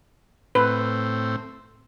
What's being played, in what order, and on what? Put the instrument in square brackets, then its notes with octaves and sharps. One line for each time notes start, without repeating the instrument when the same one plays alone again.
[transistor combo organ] A2 C4 [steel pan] B4